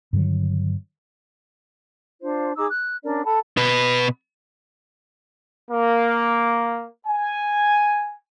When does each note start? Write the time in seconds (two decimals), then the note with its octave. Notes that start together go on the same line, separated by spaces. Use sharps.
0.13 G2 D3 D#3 F#3
2.21 D4 F4 C5
2.57 D#4 G#4 D6 E6
2.69 F#6
3.04 C#4 D4 A#4 D5
3.26 A4 F#5 A5 B5
3.57 B2 B4
5.70 A#3
7.07 G#5